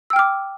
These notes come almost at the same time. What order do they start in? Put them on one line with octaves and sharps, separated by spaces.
E6 G5 F6 D6